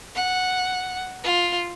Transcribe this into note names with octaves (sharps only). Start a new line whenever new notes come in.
F#5
F4